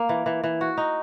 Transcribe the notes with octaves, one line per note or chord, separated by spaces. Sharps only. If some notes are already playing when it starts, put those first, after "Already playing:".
Already playing: A#3
E3
E3
E3
F#4
D#4